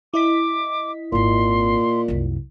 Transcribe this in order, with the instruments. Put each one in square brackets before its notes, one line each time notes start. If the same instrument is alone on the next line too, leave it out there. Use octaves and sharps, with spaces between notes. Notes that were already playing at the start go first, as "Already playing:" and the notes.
[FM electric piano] E4 D#5 B6 [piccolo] D6
[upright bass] G#1 C4 [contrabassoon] A#2 [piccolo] C6
[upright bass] C2 F#2